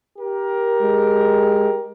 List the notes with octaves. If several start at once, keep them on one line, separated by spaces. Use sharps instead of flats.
G4 A#4
G#3